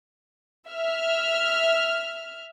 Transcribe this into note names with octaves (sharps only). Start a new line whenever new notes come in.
E5 F6